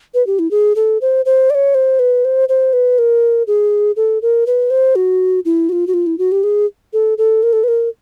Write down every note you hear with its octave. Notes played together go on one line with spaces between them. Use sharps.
B4
G4
E4
G#4
A4
C5
C5
D5
C#5
C5
B4
C5
C5
B4
A#4
G#4
A4
A#4
B4
C5
F#4
E4
F#4
F4
F#4
F4
E4
F#4
G4
G#4
A4
A4
A#4
A4
B4
A#4